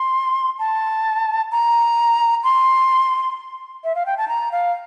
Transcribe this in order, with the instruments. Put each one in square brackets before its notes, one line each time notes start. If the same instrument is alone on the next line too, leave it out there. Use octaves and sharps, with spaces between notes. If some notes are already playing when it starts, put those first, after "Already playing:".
Already playing: [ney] C6
A5
A#5
C6
E5
F5
G5
A5
A#5
F5